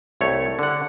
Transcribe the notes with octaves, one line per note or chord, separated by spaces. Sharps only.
C2 A3 C#5
D3 F#5